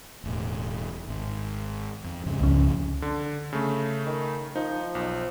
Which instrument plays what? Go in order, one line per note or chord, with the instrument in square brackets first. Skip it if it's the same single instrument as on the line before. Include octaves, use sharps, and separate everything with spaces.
[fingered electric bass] E1 A2
G#1
F2
F2 G#2 C#3
[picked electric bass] C#2 C#4
[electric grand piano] D3
C#3 A3
[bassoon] D#3
[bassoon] F3 [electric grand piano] D#4
[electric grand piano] B1